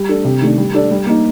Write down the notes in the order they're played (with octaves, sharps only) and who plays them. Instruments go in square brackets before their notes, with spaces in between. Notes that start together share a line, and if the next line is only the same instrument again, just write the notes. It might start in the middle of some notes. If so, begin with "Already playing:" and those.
Already playing: [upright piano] G3
D4 A4
C3
D#3 A3 D4
G3
D4 A4 D5
G3
A#3 D#4